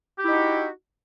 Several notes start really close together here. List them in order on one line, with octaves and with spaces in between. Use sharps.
G4 E4 D#4 F#4